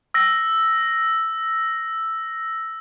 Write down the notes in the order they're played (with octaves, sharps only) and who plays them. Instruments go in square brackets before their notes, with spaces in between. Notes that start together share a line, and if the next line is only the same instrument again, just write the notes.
[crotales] E6 A#6